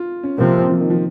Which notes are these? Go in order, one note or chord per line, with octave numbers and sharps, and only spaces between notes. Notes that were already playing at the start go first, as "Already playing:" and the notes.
Already playing: F4
C#4
C3 F3 A#3 C4
F3
D#3
F3